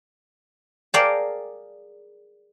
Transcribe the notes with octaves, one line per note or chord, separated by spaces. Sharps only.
G#4 A#4 D5 F5 G5 A5